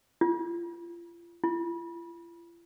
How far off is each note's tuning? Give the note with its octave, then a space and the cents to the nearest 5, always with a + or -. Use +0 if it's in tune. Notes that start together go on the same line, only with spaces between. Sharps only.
F4 -35
F4 -45